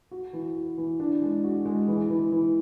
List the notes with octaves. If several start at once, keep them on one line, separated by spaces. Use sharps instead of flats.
F#4
E3
F#4
E3
D4
G#3
F#4
G#3
E3
E3
E3